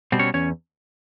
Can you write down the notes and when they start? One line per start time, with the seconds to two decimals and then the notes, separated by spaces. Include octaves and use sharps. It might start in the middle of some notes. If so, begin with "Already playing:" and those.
0.12 B2 G3 C4
0.19 C#4 C#5
0.34 E2 C#4 C#5